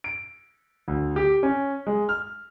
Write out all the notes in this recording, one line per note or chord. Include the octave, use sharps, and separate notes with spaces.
D7
D2
G4
C#4
G#3
F6